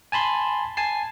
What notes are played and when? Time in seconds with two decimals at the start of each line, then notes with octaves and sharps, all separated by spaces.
0.12 G#5 A5 B5 C6
0.77 G#5 A5 C7